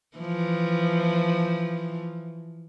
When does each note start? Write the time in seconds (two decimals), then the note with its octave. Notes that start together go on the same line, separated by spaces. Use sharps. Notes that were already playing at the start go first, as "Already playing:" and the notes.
0.17 E3 F3